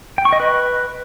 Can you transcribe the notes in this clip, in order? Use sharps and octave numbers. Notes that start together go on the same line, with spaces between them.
G5
C#6
D#5
B4